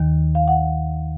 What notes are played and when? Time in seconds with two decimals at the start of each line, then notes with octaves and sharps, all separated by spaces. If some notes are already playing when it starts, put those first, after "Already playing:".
Already playing: D#2 D#3
0.35 F5
0.48 F#5